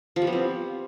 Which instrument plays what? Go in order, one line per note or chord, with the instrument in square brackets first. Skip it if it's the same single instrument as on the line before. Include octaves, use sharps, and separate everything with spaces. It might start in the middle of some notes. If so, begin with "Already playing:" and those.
[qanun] F3
G3
B3
C4